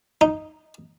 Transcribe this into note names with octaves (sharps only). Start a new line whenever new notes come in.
D#4